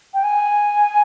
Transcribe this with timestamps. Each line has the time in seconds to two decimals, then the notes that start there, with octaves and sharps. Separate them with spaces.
0.14 G5
0.24 G#5